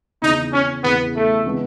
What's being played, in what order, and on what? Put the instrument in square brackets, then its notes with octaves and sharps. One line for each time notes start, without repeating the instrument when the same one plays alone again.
[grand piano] E2 C#3 E3 [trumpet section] D#4
[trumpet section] C#4
[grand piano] E2 C#3 E3 [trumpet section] B3
[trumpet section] A3
[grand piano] C#3 E3 G#3 B3